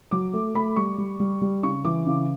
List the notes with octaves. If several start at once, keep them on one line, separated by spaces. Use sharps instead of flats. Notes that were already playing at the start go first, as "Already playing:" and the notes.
F#3 D6
A3
A3 B5
G3 C#6
G3
G3
G3
C#3 C#6
E3 D6
C#3